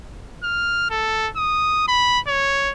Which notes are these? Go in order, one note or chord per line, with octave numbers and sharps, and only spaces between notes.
F6
A4
D#6
B5
C#5